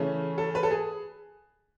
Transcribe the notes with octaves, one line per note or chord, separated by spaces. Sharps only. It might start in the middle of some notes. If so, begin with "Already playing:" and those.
Already playing: C#3 E3 A3 C#4
A4
B4
A4
G#4